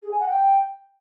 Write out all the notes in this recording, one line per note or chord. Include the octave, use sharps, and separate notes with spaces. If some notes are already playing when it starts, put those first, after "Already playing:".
G#4
G#5
F#5
G5